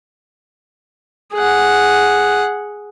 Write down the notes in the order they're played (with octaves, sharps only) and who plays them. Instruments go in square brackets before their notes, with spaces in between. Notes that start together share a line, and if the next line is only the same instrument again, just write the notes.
[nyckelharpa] G#4 F#5